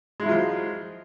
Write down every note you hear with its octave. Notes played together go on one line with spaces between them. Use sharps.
F3 F#3 G#3 E4 F4